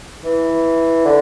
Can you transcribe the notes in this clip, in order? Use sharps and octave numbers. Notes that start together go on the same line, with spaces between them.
E3
D3